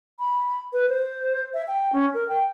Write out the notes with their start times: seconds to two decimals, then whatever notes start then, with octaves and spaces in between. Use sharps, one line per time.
0.19 B5
0.73 B4
0.89 C5
1.54 E5
1.68 G5
1.93 C#4
2.14 A#4
2.29 G5